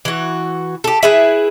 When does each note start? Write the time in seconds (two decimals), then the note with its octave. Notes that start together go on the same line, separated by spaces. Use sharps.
0.05 E3 F#4
0.84 G4 A4
1.03 E4 G#4 B4